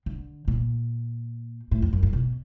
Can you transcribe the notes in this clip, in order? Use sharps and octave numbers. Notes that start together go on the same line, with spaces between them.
D3
A#2
A2
F2
F#2
G2
B2